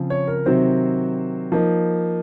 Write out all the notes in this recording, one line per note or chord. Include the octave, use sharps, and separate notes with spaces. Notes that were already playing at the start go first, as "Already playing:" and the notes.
Already playing: C#3 F3 C4
C#5
A#4
C3 D#3 F#3 C4 C5
F3 A#3 D#4